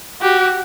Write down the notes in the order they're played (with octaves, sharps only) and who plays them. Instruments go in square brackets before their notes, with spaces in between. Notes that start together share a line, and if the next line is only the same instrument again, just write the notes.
[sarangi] F#4 [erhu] G4